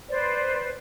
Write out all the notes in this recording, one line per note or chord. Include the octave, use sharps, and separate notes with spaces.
B4 C5 D5